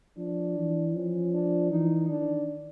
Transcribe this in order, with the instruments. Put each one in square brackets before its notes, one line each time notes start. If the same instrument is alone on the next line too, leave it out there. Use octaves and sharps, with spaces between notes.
[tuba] F3 [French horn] D4
[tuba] E3
[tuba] F3 [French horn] C#4
[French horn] D4
[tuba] E3 [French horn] D#4
[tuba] D#3 [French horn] D4